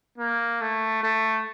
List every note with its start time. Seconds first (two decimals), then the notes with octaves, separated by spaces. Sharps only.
0.18 A#3
0.61 A3
1.03 A3